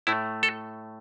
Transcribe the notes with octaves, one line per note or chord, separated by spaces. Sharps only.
A2 A3 E4
A4